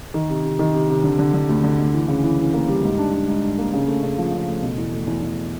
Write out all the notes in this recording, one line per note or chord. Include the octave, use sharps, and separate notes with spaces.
D#3
C3
C3
D#3
C3
C3
D3
D3
D3
D2
D3
D2
E3
C#3
E3
E3
A#3
G3
G#2
D4
D4
G#2
D4
A#3
C#3
A3
C#3
F3
C#3
A3
B2
E2
A3
E2
E2